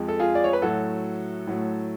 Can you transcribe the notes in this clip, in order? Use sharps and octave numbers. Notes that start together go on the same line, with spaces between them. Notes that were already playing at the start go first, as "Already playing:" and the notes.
Already playing: F2 F3 G#3
A4
F4 G#4
D5
C#5
B4
A2 F#3 A3 F#4 A4
A2 F#3 A3